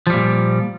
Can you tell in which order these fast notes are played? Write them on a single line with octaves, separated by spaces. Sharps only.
F3 G3 A#2